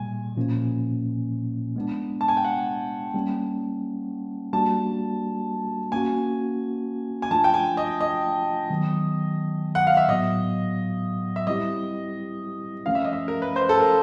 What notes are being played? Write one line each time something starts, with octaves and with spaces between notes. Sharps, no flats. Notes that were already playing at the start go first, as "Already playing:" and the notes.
Already playing: A#2 G3 A#3 G#5
A#2 F3 A#3 C#4
G#3 B3 D4
A5
G#5
G5
F#5
G3 A#3 C#4
G3 A#3 D4 F#4 A5
A#3 C#4 F#4 G#5
G#5
F3 A3 D4 F4 A5
G5
G#5
D#5
D#5
D#3 F#3 B3
F#5
F5
E5
A2 F#3 B3 D#5
E5
G3 C4 E4 G4 D#5
F3 A3 C#4 F5
E5
D#5
E5
A#4
B4
C5
A4
A#4